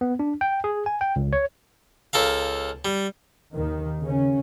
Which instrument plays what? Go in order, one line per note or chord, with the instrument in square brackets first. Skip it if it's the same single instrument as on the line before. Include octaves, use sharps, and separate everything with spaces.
[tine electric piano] B3
D4
G5
G#4
G#5
G5
C#2
C#5
[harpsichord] C#2 A4 A#4 F5
G3
[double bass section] D#2 D#3
C#3 C#4